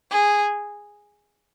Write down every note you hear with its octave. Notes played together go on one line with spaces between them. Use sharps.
G#4